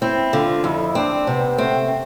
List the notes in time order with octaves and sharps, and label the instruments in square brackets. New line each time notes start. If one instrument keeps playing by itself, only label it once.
[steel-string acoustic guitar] C4 [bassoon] E4
[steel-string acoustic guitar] D3 [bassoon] F4
[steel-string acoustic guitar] F2 [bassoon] E4
[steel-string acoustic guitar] C4 [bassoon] D4
[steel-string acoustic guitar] C3 [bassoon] B3
[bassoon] A3 [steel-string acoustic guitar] C4